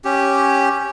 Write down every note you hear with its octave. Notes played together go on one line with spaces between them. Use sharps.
C#4 G4